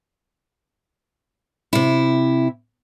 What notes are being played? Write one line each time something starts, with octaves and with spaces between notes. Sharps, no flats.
C3 E4